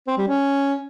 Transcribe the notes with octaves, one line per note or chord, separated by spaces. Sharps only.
C4
G3
C#4